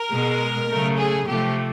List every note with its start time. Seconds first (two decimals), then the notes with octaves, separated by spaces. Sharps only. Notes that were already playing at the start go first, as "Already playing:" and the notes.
Already playing: A#4
0.12 B2 G#3
0.69 C#3 F#3 A3
0.98 G#4
1.27 C3 F3 A3 G4